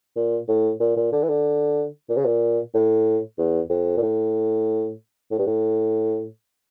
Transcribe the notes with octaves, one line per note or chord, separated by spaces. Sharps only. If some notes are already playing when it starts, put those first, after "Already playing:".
A#2
A2
A#2
A#2
D3
E3
D3
A#2
C#3
A#2
A2
E2
F2
A#2
A2
A2
G2
A2